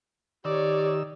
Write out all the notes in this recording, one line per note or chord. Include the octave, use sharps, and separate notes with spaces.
D#3 G4 C#5 D5 E6